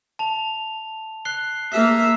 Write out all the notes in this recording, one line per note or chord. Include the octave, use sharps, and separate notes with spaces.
A5 F7
F#6 C7 G7
A#3 E5 E6 C7